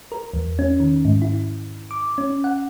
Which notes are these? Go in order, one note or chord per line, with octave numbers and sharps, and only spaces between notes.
A#4
E2
C#4
D#3
G#2
E4
D6
C#4
F#5